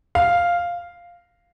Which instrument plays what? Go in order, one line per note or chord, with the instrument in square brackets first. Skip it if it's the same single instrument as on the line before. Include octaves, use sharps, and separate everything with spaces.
[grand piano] F5